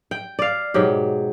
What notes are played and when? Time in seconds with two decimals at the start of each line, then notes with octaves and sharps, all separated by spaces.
0.11 G5
0.39 D5 F5
0.74 G#2 B2 F#3 G4